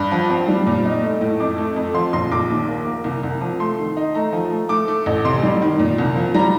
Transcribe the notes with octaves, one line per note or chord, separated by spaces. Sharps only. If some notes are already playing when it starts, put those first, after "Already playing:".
Already playing: G2
F3
C4
G3
A#2
D#4
A3
A2
F2 D6
A3
F2
F3 C6
A#1 C6
A#1 D6
D#2
A#3
A#3
C2
C2
F3
A3 C6
D#3
D#4
A3 A#5
F3
A3
A3 D6
A3
A1
C3 C6
G3
D#3
A#2
C2
F3
G3 A#5